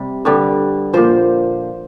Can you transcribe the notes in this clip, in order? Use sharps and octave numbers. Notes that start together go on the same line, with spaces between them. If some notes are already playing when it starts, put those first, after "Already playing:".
Already playing: C3 G3
G2 D3 G3
A#2 F3 C5